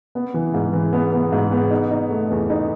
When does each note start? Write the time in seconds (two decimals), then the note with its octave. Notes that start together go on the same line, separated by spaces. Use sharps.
0.15 B3
0.34 E3
0.54 G#2
0.73 E3
0.93 B3
1.12 B3
1.32 G#2
1.52 B3
1.71 D#4
1.91 D#4
2.11 A3
2.30 E2
2.50 D#4